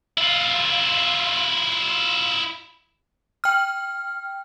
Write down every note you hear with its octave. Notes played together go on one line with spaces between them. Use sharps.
E4 F4
G5 F6